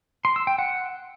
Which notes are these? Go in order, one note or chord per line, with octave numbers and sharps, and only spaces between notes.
C6
E6
G5
F#5